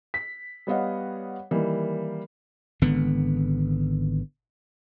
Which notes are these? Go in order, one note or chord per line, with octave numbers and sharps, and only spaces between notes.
B6
G3 B3 C#5 D#5 F5 F#5
D#3 E3 G3 A#3
G#1 D3 B3